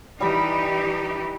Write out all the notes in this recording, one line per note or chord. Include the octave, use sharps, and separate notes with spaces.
E3 G3 D#4 G4 B5